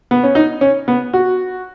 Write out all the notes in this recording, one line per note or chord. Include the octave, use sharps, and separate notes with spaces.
B3
C#4
D#4
C#4
B3
F#4